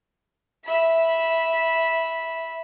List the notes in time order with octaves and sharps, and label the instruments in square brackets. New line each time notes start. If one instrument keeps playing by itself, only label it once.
[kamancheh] E5 B5